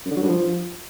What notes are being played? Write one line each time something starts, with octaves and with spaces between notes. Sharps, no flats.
F#2
D3
F#3
G2
F3